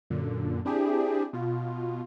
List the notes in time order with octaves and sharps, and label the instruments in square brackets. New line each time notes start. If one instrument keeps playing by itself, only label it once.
[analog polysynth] F#2 A#2 D3
C4 D4 E4 G4 G#4
B2 F4